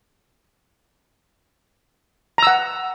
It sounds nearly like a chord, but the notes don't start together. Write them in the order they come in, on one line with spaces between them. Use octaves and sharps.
A#5 E6 F#5